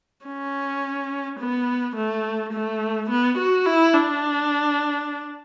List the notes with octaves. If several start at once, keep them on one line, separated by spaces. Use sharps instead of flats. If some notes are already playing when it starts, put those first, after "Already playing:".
C#4
B3
A3
A3
B3
F#4
E4
D4